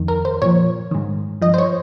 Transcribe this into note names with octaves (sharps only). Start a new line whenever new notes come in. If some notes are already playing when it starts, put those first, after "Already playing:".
Already playing: F2 D#3
A#4
C5
A#2 F3 C#5
G#2 D#3
G2 F3 D#5
C5
C#5